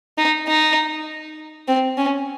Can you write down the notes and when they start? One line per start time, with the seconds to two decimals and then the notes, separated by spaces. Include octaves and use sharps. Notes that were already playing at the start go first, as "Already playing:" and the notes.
0.18 D#4
0.47 D#4
1.68 C4
1.97 C#4